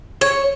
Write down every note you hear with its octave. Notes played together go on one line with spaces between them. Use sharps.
C#5